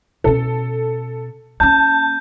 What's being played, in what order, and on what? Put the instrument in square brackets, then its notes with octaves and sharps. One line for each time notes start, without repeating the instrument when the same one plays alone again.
[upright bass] B2 C#4 [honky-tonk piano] A4
[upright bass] A#3 C#4 [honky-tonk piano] A5 [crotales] G6